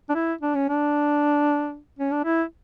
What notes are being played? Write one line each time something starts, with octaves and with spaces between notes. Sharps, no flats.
D4
E4
D4
C#4
D4
C#4
D4
E4